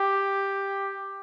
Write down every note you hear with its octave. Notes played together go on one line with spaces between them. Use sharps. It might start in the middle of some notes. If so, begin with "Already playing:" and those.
Already playing: G4